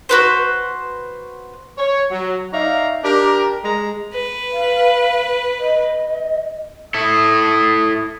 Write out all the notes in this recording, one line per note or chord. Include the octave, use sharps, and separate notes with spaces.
F#4 B4 C5
C#5
F#3
D#4 C#5 D5 E5 F5 A#5
D4 G4 A#4
G#3 A#5
B4
F5
D#5
E4 A4 D#6